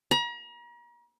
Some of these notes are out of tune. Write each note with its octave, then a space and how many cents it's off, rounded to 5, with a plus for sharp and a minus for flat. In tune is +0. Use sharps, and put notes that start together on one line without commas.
A#5 +40